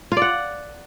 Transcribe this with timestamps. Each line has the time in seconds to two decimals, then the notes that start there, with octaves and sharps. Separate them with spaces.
0.12 F4
0.17 D5
0.22 F#5